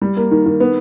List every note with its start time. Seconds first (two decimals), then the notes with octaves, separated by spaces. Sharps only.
0.02 G3
0.17 A#3
0.31 D#3
0.46 D#3
0.60 B3